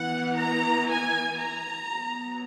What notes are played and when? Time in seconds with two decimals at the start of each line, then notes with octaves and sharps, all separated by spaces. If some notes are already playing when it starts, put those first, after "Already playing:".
Already playing: E3 B3 F#5
0.37 A#5
0.88 G#5
1.38 A#5
1.88 F#3 B3